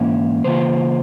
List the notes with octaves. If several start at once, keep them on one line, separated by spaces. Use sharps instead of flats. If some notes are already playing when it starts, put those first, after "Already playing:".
Already playing: G#2 E3 A#3 C#4 E4
C#3 E3 A#3 F4 C5